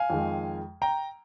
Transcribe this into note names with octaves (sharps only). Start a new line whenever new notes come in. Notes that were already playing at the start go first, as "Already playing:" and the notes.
Already playing: F5 G#5
F2 D#3 G#3
G5 A#5